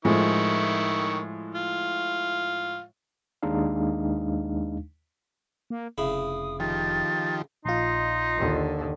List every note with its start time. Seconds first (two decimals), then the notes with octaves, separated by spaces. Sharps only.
0.05 A2 D#3 F3 G#3 E4 C#6
1.55 F4
3.43 D#2 G#3 D4 D#4 F5
5.70 A#3
5.98 F1 C#3 E4 D#6
6.60 D#3 F3 G4 A6
7.65 A#1 A#2 D#4 F4 D#5 C6
8.37 D#2 D3